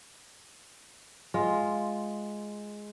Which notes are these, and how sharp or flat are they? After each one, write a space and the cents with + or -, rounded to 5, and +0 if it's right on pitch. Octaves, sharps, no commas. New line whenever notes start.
G#3 +5 F4 +0